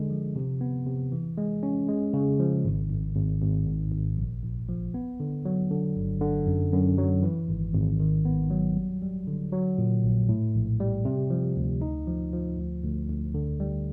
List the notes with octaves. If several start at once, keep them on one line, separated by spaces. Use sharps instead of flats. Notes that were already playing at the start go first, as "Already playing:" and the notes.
Already playing: D3 G#3
F3
C3
B3
C3
E3
G#3
C#4
G#3
C#3
F3
G#1
G#1
G#1
G#1
G#2
G#1
A#1
A#1
F3
B3
D3
F#3
D3
G1
D3
F#2
F#2
F#3
E3
G#1
G#1
D#3
B3
F#3
G3
G3
D3
F#3
A#2
A#1
A2
A#1
G3
C3
F3
D2
D#4
F3
F3
D2
D2
D2
D3
G3